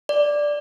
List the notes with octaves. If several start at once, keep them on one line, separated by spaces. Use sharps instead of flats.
D5